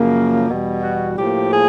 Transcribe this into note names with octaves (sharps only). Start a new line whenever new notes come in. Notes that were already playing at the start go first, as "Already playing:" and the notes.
Already playing: F#2 C#3 F3 A#3
E2 B2 G3
F#4
A2 F3 A#3 G4
G#4